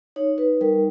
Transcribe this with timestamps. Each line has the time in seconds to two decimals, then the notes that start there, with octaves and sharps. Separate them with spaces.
0.16 D#4 C#5
0.38 B4
0.61 G3 A#4